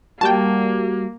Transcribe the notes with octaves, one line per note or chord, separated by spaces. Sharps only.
G3 A#3 F#4 G5 A5